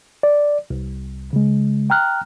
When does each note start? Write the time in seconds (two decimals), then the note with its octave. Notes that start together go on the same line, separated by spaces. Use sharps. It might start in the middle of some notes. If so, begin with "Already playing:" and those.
0.23 D5
0.70 C2
1.33 C#3 G#3
1.90 G5 A#5 F6 F#6